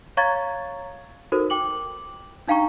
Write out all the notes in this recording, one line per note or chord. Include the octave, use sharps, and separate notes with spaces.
C#5 F5 A#5 C#6 G#6 A6
D#4 F#4 A4 A#4 C5
G5 D6 F#7
D4 D#4 F5 G5 A#5 C#6